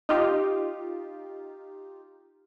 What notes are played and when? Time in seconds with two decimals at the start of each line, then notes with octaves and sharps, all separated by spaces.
0.09 D#4 F4 G4